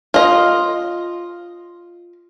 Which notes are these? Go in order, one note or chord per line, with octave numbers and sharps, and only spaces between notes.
F4 D#5